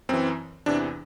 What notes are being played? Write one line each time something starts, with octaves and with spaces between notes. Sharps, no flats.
F#2 E3 C4
E2 C3 E3 D4